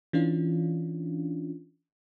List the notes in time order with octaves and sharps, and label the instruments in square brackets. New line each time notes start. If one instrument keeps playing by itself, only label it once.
[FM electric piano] E3 C#4 D4 F4